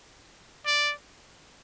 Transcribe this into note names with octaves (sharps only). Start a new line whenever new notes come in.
D5